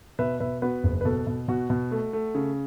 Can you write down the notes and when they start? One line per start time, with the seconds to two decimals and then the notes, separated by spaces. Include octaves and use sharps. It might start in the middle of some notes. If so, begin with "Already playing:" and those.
0.19 B2 B4 E5
0.40 B2 B4 E5
0.62 B3 F#4 B4
0.83 F#1
1.01 B4
1.05 B2 A4
1.27 B2
1.48 B2 F#4
1.70 B2
1.91 A3
2.13 A3
2.35 C#3